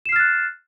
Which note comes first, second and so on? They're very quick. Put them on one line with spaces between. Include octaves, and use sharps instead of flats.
E7 C7 F6 A6 F#6